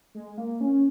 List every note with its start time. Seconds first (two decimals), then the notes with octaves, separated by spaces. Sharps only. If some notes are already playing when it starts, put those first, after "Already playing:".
0.15 G#3
0.38 A#3
0.61 C#4